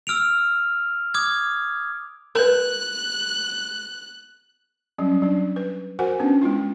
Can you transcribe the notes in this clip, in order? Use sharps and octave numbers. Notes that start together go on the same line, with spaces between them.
E6 F6 D7 F7
D6 D#6 F6 G#6
A#4 B4 F#6
F#3 G3 C#4
F#3 D4
B4
F#4 A#4 C5 F#5 G#5
B3 C#4 D4 B4
G#3 B3 E4 F4